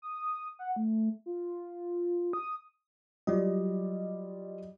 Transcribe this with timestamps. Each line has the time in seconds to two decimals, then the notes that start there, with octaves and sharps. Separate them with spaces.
0.02 D#6
0.59 F#5
0.76 A3
1.26 F4
2.33 D#6
3.27 F#3 G3 F4 D5 D#5